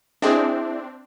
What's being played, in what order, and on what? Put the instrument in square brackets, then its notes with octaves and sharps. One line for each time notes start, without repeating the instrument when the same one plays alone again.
[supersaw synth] C4 D4 [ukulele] E4 G#4 D#5